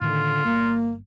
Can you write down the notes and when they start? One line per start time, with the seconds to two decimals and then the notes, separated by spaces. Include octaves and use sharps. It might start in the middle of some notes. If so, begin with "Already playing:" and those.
0.01 A2 D3 D#3 F4
0.45 G1 A#3